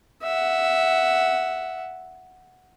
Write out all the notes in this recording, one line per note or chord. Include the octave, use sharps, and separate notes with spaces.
E5 F#5